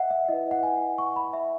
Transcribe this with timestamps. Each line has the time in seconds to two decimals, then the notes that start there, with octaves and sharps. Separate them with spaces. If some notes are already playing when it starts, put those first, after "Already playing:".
Already playing: D#5 E5 F#5
0.10 E5
0.29 E4 B4 D#5
0.51 F#5
0.63 G#5
0.98 C#6
1.16 B5
1.33 E5